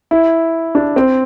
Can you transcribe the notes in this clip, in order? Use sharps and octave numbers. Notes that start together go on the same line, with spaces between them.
E4
D4
C4